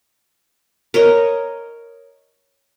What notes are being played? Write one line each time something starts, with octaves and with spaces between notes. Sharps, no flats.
A#4 C#5 D#5